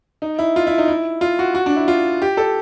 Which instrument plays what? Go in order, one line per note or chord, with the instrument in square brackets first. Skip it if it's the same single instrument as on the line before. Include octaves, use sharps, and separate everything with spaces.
[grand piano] D#4
E4
F4
E4
D#4
E4
F4
F#4
F#4
D4
E4
F4
G4
A4